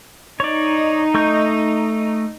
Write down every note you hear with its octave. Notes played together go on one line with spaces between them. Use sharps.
D#4 C#5 D5
A3 C#6 G6